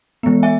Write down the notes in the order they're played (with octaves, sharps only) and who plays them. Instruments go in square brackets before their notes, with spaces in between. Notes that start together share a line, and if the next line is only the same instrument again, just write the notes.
[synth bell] E3 G#3 B3
E5 G#5